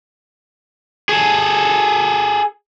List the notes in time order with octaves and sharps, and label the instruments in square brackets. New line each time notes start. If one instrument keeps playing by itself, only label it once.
[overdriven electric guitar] G#4 A4